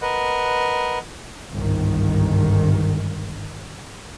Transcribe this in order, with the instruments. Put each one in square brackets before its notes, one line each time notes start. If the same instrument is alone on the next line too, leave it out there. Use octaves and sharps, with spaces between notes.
[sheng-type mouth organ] A#4 B4 D#5 F#5
[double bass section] G1 C2 G#2 D#3